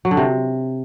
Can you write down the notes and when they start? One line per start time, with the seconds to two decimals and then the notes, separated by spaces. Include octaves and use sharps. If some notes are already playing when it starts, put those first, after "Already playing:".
0.05 F#3
0.11 D3
0.17 C3